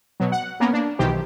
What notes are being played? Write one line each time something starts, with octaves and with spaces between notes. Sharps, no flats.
B2 F#3
F#5
A#3 B3 C#4 A#4
A#3 D4
B1 D#3 E3 G4 C5